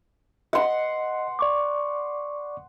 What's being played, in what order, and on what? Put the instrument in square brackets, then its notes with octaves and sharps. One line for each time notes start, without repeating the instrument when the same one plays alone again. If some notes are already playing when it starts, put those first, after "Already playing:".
[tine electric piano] D#5 [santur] F#5 C6
[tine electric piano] D5 C#6 D6